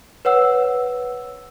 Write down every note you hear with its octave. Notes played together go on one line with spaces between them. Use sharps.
B4 C#5 F#5 E6